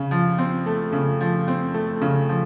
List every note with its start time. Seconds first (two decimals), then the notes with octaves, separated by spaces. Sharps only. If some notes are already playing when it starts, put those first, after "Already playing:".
Already playing: C#3
0.11 F3
0.38 C4
0.66 A3
0.93 C#3
1.21 F3
1.48 C4
1.74 A3
2.02 C#3
2.29 F3